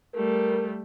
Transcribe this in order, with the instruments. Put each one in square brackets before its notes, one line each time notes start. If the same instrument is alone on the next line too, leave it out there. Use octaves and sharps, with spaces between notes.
[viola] G3 A3 [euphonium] A#4